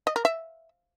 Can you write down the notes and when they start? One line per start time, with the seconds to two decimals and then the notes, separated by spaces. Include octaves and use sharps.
0.07 D#5
0.16 A#4
0.25 E5